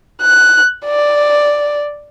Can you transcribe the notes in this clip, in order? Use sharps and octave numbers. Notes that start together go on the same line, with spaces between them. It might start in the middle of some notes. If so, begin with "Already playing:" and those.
F#6
D5